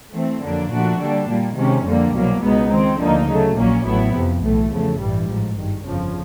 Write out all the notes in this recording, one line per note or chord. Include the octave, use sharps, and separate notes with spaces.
E3 A3 C4
F2 D3 F#3 A#3 D4
A#2 F3 A3 D4 F#4
D3 G3 A#3 D4
A#2 G3 A#3
C3 D#3 G#3 C#4
F2 D3 G3 A#3
C2 B2 F#3 A#3
C#2 B2 G#3 B3 D#4
D#3 G#3 C4
D2 D3 F3 A#3 D#4
C#3 F#3 A3
A#1 A#2 F#3 A#3 C#4
A1 A2 F#3 B3 E4
F2 C3 F3
B1 A2 E3 A3
E2 C#3 F3 A3
A1 G2 E3 G3
A1 G#2 F3
G#1 G2 D#3
G1 F2 C#3 F3